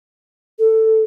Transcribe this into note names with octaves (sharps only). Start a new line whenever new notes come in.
A4